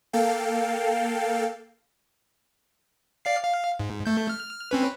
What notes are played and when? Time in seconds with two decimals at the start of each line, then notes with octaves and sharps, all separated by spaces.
0.13 A#3 A4 F5 G5
3.25 D5 F5 C7
3.43 F5
3.80 G#2
4.06 A3 G6
4.29 F6
4.71 C4 C#4 B4